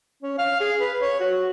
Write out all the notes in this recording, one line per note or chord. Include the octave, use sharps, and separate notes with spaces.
C#4
F5
G#4
B4
C#5
F#4